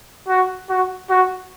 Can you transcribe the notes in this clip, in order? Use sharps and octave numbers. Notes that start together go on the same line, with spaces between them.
F#4
F#4
F#4